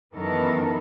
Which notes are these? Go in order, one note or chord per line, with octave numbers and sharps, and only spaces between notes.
F#2 D#3 E3 B3 A4 A#4